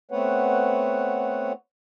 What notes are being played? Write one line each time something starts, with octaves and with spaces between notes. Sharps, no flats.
A3 B3 C4 B4 C#5 F#5